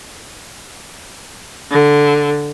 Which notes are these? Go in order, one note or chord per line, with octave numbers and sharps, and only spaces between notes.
D3